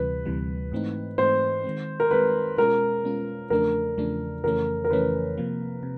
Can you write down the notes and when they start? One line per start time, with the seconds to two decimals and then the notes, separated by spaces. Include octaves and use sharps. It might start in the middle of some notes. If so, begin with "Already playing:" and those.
Already playing: D2 C3 E3 G3 B4
0.25 D2 C3 E3 G3
0.72 G#2 E3 A3 C4 D#4
1.18 G#2 E3 A3 C4 D#4 C5
1.64 D#3 G#3 C4
2.00 A#4
2.11 D#3 G#3 C4 B4
2.58 B2 G#3 C#4 F4 A#4
3.04 B2 G#3 C#4 F4
3.50 E2 C#3 F3 A3 D4 A#4
3.98 E2 C#3 F3 A3 D4
4.44 F2 C#3 E3 A3 C#4 A#4
4.85 A#4
4.90 F2 C#3 E3 A3 C#4 B4
5.37 C3 F3 A#3
5.83 C3